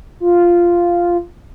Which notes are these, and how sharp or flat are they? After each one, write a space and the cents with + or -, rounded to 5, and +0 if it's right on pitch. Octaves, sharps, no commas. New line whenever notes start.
F4 -5